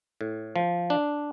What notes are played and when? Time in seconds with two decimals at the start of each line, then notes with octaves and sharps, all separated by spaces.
0.21 A2
0.56 F3
0.90 D4